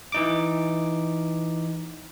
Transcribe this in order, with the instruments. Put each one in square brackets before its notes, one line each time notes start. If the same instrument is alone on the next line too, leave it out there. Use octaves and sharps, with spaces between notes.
[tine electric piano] E3 D#4 D6